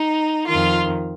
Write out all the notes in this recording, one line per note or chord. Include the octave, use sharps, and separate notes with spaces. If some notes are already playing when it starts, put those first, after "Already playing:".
Already playing: D#4
F2 D#3 F4